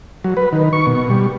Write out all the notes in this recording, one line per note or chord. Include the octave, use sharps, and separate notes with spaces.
F#3
B4
D#3
C#6
B2
G3